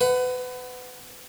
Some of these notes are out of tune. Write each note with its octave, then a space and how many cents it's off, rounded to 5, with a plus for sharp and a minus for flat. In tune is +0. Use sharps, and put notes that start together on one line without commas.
B4 +30 F#5 +0